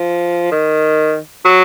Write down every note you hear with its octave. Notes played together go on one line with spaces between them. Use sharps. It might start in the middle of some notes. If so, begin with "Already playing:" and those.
Already playing: F3
D#3
F#3